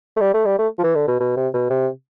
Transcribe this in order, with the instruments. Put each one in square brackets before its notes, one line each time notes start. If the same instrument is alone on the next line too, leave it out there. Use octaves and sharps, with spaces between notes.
[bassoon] A3
G3
A3
G3
A3
F3
E3
D3
B2
B2
C3
B2
C3